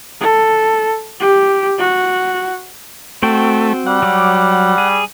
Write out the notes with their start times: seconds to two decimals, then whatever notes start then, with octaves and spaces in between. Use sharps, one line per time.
0.21 A4
1.20 G4
1.79 F#4
3.23 A3 C4 F#4 G5
3.87 G3 F#5
4.03 F#3 D6
4.78 G#4